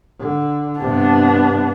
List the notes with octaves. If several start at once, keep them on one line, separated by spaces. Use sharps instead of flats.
D3
G2 C3 B3 D4